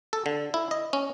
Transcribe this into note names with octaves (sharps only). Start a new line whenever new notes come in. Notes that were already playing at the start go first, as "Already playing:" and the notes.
A4
D3
E4
D#5
C#4